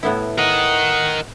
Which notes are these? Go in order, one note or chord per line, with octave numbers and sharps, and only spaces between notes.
A2 B3 E4
A#4 D#5 F#5